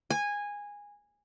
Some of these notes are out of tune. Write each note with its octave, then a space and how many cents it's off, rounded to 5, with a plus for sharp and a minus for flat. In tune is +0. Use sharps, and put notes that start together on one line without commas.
G#5 -15